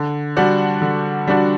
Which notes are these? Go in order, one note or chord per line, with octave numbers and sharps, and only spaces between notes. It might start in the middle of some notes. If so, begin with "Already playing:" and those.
Already playing: D3
G3 D4 F#4
D3
G3 D4 F#4